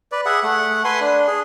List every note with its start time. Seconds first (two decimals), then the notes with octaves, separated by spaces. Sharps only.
0.12 B4 D5
0.26 G#4 E5 F#5
0.43 A3 F#5
0.85 B4 G#5 C6
1.01 D4
1.27 G#4